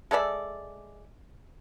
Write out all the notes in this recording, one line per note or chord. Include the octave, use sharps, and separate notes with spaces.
G#3 A4 D5 E5